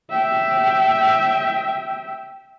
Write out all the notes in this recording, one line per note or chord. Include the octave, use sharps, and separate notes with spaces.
E5 G5